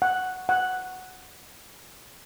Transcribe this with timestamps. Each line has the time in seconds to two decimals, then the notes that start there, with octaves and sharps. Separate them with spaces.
0.02 F#5
0.49 F#5